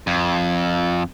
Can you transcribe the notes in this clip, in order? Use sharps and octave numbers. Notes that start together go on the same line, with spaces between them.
F2